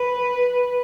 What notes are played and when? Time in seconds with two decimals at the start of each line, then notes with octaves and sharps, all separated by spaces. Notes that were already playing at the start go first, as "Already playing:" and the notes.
Already playing: B4